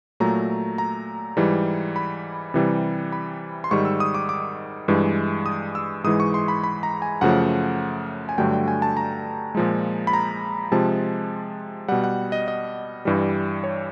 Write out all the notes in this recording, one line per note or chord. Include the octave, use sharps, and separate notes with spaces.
A#2 F#3 A3 A#5
A#5
G#2 E3 G3
B5
C3 E3 G3
B5
C6
G#2 D#3 G3 C#6
E6
D#6
D6
D6
G2 E3 G#3
D#6
E6
G#2 E3 G#3 D#6
C#6
C6
B5
B5
A#5
G#5
F#2 C#3 F3 A3 F#5
G#5
G2 D3 F#3 A3 G5
G5
G#5
A5
A#5
A#2 F3 G#3
B5
A#5
C3 F3 G#3 A5
B2 G3 F#5
F#5
D#5
D#5
G2 E3 G3
C#5